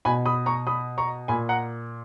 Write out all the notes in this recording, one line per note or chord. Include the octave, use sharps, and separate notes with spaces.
B2 G#5 B5
B5 D#6
A#5 C#6
B5 D#6
A#5 C#6
A#2 G#5 B5
F#5 A#5